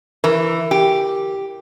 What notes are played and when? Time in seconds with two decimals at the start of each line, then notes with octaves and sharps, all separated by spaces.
0.24 E3 A#4
0.71 G4